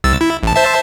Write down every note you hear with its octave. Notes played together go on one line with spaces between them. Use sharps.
C2 E6 A6
E4
A1 A5
C5 E5 A5